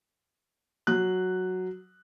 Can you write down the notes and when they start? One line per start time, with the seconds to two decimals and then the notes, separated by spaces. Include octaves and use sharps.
0.87 F#3 F#6